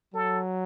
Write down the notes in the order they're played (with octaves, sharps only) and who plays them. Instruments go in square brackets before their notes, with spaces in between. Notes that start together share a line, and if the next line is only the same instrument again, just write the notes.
[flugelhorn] F#3 [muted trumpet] A4